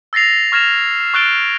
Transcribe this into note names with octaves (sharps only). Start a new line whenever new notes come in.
E6 A6 A#6 C7 F7
C#6 F6 G#6 A#6 E7 F7
C#6 E6 F#6 A6 D7 G7